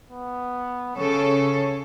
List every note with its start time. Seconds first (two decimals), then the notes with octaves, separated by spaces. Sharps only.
0.10 B3
0.96 C#3 A4 C#5